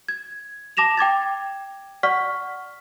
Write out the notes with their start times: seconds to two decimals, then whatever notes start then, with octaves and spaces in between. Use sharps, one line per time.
0.08 G#6
0.77 A5 D6 A#6 E7 F7
0.97 G5 D6 G#6 A6
2.03 D5 F#5 C#6 F6 B6